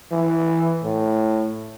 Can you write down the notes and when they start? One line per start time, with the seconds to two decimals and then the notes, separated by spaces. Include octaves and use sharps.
0.12 E3
0.84 A2